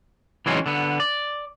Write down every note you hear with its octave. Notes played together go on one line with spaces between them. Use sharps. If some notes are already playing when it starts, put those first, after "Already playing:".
E3 F#3 G#3 C4 C#4 D#4
D3 B3
D5